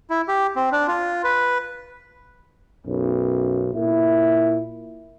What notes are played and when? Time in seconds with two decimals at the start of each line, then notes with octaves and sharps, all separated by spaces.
0.10 E4
0.28 G4
0.56 C4
0.72 D4
0.88 F4
1.24 B4
2.86 B1 F#2
3.75 A#2 E4